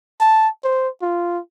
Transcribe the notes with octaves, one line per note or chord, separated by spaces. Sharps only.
A5
C5
F4